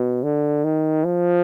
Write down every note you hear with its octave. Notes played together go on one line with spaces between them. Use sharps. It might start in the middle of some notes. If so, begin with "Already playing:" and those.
Already playing: B2
D3
D#3
F3